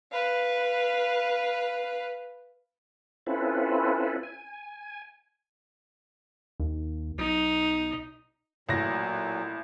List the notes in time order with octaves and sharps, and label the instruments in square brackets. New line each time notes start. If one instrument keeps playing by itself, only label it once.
[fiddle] B4 F5
[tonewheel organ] C4 C#4 E4 F4 A4 B4
G#5
[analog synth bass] D#2
[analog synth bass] B1 [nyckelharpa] D#4
[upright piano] A1 A#6 [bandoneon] A#2 F#3